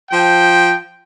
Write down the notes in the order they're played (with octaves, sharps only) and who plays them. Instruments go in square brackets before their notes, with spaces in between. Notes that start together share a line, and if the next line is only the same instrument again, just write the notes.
[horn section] F3 G5